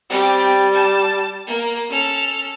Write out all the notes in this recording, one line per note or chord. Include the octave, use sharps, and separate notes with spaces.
G3 C4 G4
A5
A#3
C#4 A4 F7